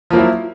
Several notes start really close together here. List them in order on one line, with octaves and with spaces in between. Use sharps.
F3 A#3 F#3 E4